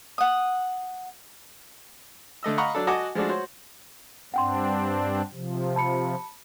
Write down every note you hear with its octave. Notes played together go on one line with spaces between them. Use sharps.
F#5 D#6
D3 A3 D#5 E6
D#5 F5 F#5 A#5 B5 C#6
F#3 D4 A4
F#4 D#5 F#5 G#5 A5 D6
F3 G#3 A3 D4 F#4
F#4 C5 C#5
G2 C4 D4 F#5 G5 C6
C3 F3
A5 B5 C#7